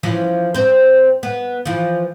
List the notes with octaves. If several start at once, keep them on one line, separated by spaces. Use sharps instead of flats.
E3 F3 C#4
C4 C5
B3
E3 F3